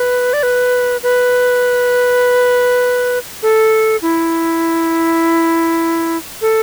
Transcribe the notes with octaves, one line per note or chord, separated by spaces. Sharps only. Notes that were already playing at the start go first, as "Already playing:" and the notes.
Already playing: B4
D5
B4
B4
A4
E4
A4